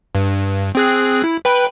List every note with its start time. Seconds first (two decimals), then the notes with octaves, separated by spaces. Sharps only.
0.15 G2
0.75 C4 G#4 F#6
1.24 E4
1.45 B4 G5 B5